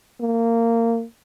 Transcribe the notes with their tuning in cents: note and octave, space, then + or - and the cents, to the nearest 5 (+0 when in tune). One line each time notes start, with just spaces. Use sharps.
A#3 -20